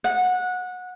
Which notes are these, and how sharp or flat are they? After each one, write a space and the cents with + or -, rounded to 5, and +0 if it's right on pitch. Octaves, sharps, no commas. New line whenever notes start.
F#5 -20